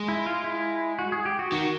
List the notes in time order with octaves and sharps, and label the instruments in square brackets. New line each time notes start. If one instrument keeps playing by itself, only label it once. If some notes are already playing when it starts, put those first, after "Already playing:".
Already playing: [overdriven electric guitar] G#3
[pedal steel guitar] E4
F4
E4
F#4
G#4
G4
F#4
[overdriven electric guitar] D#3 [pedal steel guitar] F#4